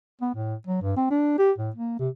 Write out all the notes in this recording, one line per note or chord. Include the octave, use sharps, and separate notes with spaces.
B3
A2
F#3
G2
C4
D4
G4
A2
A#3
C3